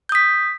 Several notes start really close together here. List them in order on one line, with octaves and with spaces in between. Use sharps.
G6 D#6 B6